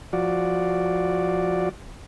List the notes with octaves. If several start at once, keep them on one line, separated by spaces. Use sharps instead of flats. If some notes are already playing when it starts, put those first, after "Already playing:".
F3 F#4 D5